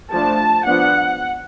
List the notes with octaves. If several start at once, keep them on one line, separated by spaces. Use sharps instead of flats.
F3 A3 D4 A5
F3 B3 D4 F#5